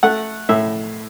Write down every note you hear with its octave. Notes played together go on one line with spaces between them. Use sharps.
A3 F#5
A2 E5